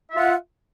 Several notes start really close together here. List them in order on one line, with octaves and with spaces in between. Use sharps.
E5 F4 F#5